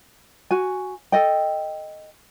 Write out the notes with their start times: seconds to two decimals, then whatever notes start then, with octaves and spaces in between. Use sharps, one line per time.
0.51 F#4 G#5
1.12 A4 D#5 G5